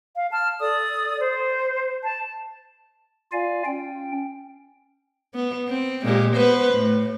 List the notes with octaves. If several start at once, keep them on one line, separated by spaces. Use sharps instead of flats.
F5
A5 F6
A4 D5 D#6
C5
A5
F4 D5 F5 G#5
C#4 G5
B3
C4
A#2 G#3 G4
B3 B4 C5
A2